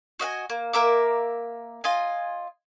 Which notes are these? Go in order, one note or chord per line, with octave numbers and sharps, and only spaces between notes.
F#4 D#5 F#5 G#5
A#3
A#3 A#4 E5 D6
F4 D#5 G#5